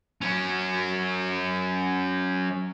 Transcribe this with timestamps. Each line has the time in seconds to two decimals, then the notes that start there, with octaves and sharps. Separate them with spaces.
0.22 F#3 C#4